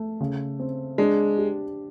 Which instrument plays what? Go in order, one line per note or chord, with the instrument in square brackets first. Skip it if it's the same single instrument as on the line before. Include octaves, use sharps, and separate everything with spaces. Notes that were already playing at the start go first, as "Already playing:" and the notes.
Already playing: [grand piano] A3
C#3
C4
[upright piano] G#3 [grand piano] D4
[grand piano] G4